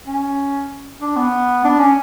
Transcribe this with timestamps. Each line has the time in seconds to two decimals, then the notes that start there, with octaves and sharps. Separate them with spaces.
0.06 C#4
1.01 D4
1.17 B3
1.64 D4
1.80 C#4